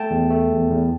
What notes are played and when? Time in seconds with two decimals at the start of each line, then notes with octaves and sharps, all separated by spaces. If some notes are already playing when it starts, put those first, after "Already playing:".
Already playing: A3 G5 A5
0.10 E2
0.31 A3
0.51 E2
0.71 E2